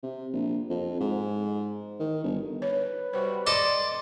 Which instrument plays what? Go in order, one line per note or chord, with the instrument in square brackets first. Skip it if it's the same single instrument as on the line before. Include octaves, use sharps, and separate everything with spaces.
[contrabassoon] C3
A#1
F2
G#2
D#3
G1
[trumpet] B4 [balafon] C#5
[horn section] C3 G3 F#4 [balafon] C5
[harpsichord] A4 D#5 [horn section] D5 [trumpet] C6 [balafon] D6